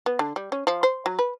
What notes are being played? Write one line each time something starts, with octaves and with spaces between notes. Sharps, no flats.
B3
D3
G3
C#4
F3
C5
F#3
B4